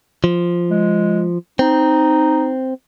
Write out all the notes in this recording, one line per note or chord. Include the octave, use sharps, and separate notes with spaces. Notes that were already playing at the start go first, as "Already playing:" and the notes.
F3
G#3
C4 D#4